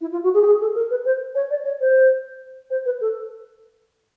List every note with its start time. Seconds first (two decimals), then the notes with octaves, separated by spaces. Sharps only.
0.01 E4
0.12 F4
0.23 F#4
0.34 G#4
0.42 G4
0.46 G#4
0.61 A4
0.75 A#4
0.90 B4
1.05 C5
1.35 C#5
1.50 D5
1.65 C#5
1.80 C5
2.70 C5
2.85 B4
3.01 A4